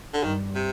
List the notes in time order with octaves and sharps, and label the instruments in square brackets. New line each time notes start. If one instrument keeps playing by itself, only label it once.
[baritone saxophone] D3
[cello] G2 [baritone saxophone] D#3
[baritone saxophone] C3